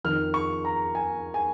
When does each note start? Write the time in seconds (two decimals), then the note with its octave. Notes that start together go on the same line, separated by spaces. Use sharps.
0.04 F2 D#3 F6
0.34 C#6
0.65 A#5
0.95 G#5
1.34 G#5